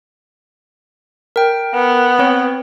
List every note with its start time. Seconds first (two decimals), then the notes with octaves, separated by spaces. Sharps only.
1.36 A#4 G5
1.74 B3
2.19 C4 C#5